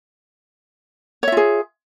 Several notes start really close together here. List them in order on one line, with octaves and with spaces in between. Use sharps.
C#5 E5 F4 G#4